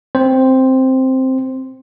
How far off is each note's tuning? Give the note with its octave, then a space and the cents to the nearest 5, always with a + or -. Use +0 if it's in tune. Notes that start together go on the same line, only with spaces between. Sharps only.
C4 +0 C5 +0